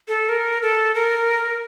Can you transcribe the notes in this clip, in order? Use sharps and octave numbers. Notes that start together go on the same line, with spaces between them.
A4
A#4
A4
A#4